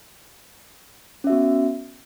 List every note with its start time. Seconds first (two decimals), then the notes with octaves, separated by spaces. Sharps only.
1.24 C#4
1.27 E5
1.30 F#4
1.32 B3